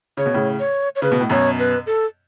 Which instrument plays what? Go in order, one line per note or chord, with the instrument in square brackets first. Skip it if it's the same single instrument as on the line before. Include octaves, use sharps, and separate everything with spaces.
[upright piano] C#3 [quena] C#5
[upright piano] B2
A2 C#3
[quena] C#5
C#5
[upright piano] C#3 [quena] B4
[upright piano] B2
A2
[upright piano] F#2 B2 [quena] C#5
[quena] B4
A4